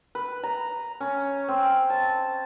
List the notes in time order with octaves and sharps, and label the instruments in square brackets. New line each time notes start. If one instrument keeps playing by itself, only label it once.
[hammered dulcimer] B4
A#5
C#4
C4
A5